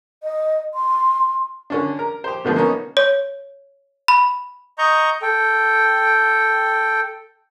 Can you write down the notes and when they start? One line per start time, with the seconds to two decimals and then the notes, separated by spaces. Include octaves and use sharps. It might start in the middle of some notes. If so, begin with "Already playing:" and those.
0.22 D#5
0.74 C6
1.70 D3 C#4 D4
1.99 A#4
2.24 G4 C5
2.45 B2 D3 F3 A3
2.56 A#3 B3 C#4 D#4
2.97 C#5
4.08 B5
4.78 D#5 A#5 C#6 G6
5.22 A4 G5